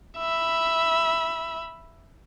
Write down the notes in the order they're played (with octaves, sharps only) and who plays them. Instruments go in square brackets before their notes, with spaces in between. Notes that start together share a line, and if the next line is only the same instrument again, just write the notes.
[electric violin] E5 B5